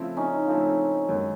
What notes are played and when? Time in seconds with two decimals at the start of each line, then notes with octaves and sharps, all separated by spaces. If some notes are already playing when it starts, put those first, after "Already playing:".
Already playing: C#3 F3 A3 C4 E4
0.17 C#4 D#4
0.46 C#3 F3 A3 C4 E4
1.09 F#2 D#3 G#3